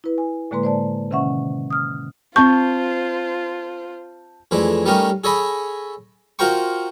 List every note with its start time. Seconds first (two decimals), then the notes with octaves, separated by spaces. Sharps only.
0.04 E4 B4
0.18 G#5
0.51 A2 D3 G#3 A#3 B4 C6
0.63 C5 D5 A5
1.11 C3 D#3 C#4 E5 F#5 C#6
1.70 D#6 F6
2.36 C4 F4 C5 A5 C#6 G6
4.51 F2 E3 G#3 A3 D4
4.86 G3 A3 C#4 D#4 G4 A#4
5.24 G#4 A4 C#5 D#5 G#5 B5
6.39 F4 F#4 A#4 C5 G5 C#6